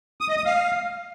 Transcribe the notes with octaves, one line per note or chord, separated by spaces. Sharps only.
D#6
D#5
D#6
F5